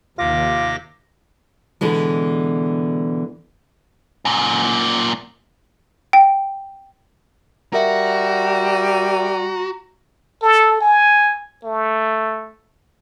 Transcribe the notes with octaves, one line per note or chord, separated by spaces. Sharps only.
D#2 C3 D#3 F4 D6 A#6
B2 D3 E3 G#3
F#2 A#2
G5
G3 F#4 A#4 E5 A#5
A4
G#5
A3